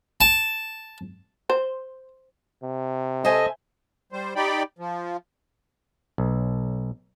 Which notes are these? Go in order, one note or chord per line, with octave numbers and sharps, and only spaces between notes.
A5
C5
C3
A4 C5 D#5 E5 G#5
G3 C5
D#4 G4 D5 G5 B5
F3
B1